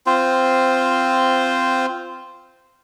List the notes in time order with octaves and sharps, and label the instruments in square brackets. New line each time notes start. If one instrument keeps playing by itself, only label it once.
[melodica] C4 F4 C5